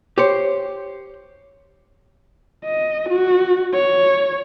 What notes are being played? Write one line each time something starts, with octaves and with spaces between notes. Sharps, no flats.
G4 C5 C#5
D#5
F#4
C#5